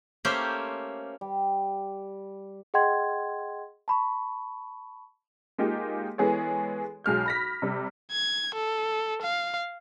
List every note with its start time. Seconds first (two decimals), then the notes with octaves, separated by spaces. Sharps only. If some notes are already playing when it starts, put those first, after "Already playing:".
0.25 A3 A#3 C#4 G4 C5
1.21 G3
2.74 G#4 D#5 F#5 G5 C6 G#6
3.88 A5 B5 C#6
5.58 G#3 A#3 D#4 F4 G4
6.18 E3 G#3 B3 G#4 A4 C#5
7.04 B1 G#3 F6 G6
7.26 B5 A#6 B6
7.62 C3 G3
8.12 G#6
8.54 A4
9.22 F5